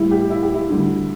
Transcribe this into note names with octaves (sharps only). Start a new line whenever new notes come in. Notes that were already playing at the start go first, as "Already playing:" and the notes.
Already playing: A2 E3 G3 E4
G4
E4
G4
E4
D2 D3 G3